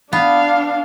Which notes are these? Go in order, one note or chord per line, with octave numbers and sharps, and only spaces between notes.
B3 D4 F5